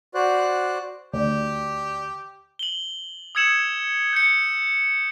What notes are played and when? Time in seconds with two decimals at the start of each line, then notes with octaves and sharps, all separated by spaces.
0.15 F#4 C5 D5 F#6
1.14 D2 G4 D5
2.59 F#7 G7
3.35 D#6 E6 G#6 C#7 E7 F#7
4.13 G6 G#6 C#7